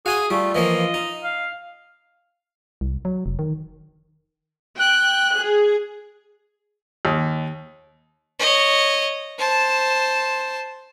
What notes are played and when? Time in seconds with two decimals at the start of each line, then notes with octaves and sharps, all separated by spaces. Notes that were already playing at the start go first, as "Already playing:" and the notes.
0.06 F#4 G#4 F5 G#5 C6
0.30 G3 A3 F4
0.55 E3 F3 A#3 D#5
0.94 D#4
1.24 F5
2.81 C2
3.05 F#3
3.26 F1
3.39 D#3
4.79 G5 F#6
5.38 G#4
7.05 D#2
8.39 C#5 D#5
9.39 C5 A5